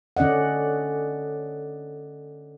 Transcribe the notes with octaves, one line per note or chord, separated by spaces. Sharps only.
D3 C#4 D5 D#5 F#5